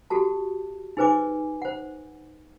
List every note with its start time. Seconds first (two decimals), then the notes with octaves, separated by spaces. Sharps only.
0.10 F#4 G4 A4 A5
0.97 D#4 G#4 B4 C5 G#5 D6
1.62 C5 F#5